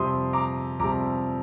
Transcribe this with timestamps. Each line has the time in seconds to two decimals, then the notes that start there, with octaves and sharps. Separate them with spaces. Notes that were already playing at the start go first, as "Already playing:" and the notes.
Already playing: F2 C3 G3 C6 D#6
0.33 A#5 D6
0.79 F2 C3 G3 A#5 D6